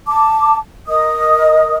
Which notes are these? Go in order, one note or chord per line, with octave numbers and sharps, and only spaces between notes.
A5 D6
A#4 D#5 D#6